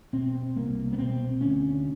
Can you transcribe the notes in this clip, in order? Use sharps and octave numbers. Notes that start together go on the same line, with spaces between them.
B2 C4
C2 A#3
B3
B2 C4
D2 C#4